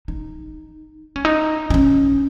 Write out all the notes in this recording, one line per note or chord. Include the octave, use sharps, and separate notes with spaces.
D#4
C#4
D#4
D#4
C#4